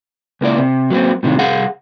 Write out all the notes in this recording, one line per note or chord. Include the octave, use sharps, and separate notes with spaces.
C#2 A#3 E4 D5
C3
F#3 A#3 C4
A2 C3 D#3
C2 G#4 F5 F#5